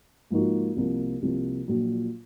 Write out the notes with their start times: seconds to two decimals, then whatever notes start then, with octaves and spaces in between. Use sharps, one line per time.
0.31 G#2 F3 A#3 D#4 F#4
0.76 C2 C3 F3 A#3
1.22 C2 C3 F3 A#3
1.68 A#1 A#2 F#3